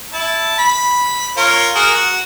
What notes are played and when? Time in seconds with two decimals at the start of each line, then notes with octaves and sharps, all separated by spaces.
0.13 E4 A5
0.58 B5
1.37 F4 A#4 C#5
1.75 F#4 G#4 A#4
1.95 F#4